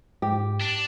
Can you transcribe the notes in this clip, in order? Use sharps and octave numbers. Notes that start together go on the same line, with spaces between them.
G#2 G4
D4